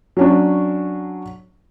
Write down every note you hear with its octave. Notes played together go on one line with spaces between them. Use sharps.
F#3 C#4 D4